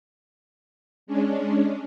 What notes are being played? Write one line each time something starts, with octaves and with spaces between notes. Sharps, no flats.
G#3 C#4 D4